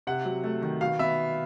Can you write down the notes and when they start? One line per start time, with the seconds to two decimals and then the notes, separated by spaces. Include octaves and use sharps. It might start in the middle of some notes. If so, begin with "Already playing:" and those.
0.07 C3 F#5
0.25 F#3
0.44 A3
0.62 D#3
0.81 B2 F5
0.99 B3 E5